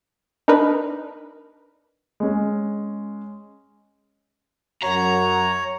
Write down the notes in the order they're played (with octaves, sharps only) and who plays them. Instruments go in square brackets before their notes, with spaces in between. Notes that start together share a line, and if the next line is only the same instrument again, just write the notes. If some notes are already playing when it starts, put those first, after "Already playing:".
[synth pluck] D4 D#4 A#4 B4
[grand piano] G#3 C#4
[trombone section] F#2 F#3 [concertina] C#5 [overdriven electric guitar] A#5